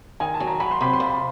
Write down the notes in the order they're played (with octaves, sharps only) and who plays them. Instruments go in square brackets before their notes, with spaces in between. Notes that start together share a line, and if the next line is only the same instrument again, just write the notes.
[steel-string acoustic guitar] D#3 [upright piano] G#5
[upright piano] A5
[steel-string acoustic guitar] F#3
[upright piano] A#5
[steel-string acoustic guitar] F#3 [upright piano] B5
[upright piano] C6
[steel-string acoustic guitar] C3 [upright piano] B5
[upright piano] C6
[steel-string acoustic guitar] F2 [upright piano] B5